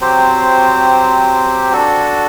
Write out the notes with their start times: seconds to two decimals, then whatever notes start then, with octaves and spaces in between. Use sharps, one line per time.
0.01 F#3 C4 G4 C5
1.72 D4 F#4 A4